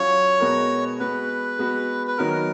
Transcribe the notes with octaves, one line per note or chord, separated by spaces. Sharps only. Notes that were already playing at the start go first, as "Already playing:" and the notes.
Already playing: F#3 C#4 F4 C#5
B2 G#3 B3 F#4 A#4
G#3 B3 F#4 B4
G#3 B3 F#4
B4
D#3 F#3 B3 D#4 F#4 A#4